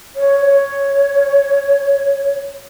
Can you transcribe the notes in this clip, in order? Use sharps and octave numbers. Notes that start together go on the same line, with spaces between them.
C#5
C#5